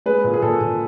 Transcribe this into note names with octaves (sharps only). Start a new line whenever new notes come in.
G#3 B4
A#2
G#4
A#2 A4
A#2